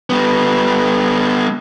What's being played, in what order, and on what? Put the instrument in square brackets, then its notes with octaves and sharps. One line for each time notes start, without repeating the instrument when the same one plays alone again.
[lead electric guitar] G3 B3